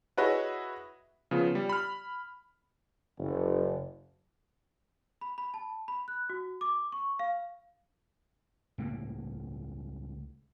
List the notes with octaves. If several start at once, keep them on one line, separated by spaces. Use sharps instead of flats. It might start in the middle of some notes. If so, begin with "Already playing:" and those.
E4 F#4 G#4 B4 C#5 D#5
C#3 F3 B3 F4
G3
B5 F6
F#1
B5
B5
A5
B5
F#6
F#4
D6
C#6
F5
C#2 A2 G3 A#3